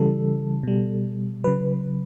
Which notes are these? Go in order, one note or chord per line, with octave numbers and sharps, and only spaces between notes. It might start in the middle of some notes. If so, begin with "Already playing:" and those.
Already playing: C#3 E3 G3 A4
B2 G3
C#3 F#3 B4